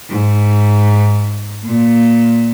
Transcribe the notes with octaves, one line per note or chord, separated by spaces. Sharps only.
G#2
A#2